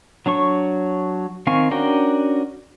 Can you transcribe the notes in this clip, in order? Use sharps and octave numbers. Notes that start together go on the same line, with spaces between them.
F#3 D4 C#5 C#6
D#3 C4 F5 G#5 C#6
C#4 D4 F#4 A#4 G5